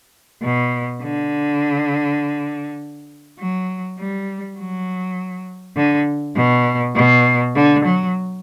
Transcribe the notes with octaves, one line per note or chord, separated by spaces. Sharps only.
B2
D3
F#3
G3
F#3
D3
B2
B2
D3
F#3